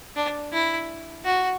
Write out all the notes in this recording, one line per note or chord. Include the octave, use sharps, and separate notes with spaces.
D4
E4
F#4